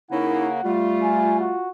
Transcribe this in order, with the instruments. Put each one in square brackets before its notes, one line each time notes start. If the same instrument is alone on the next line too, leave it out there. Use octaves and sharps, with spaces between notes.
[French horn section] C#3 A#3 [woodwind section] C#4 D#4 E4 [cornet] F#5
[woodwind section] G3 A3 [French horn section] F4
[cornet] G#5
F#4